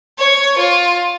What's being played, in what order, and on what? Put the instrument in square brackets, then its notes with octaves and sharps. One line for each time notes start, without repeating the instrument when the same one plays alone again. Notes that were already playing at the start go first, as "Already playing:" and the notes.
[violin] C#5
F4